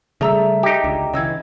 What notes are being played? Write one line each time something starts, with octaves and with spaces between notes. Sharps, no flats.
C#3 G3 A3 G#4 E5 A#5 E6
D#4 G4
C#2 D3
C#3 E3 D#5 E6 G#6